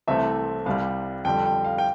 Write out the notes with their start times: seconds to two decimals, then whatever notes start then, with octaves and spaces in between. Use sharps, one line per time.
0.07 C2 C3 E3 A3 C4 E5
0.66 C2 C3 G3 F5
1.25 F2 D3 G3 G5
1.45 G5
1.64 F5
1.78 G5